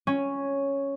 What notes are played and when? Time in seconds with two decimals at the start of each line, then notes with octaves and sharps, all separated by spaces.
0.07 C#4